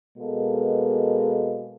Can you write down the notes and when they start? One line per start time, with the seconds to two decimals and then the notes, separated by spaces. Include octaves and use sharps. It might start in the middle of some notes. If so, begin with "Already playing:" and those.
0.18 B2 G#3 A#3 A4 B4